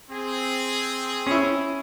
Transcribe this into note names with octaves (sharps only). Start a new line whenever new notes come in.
C4 G#4
C#4 E4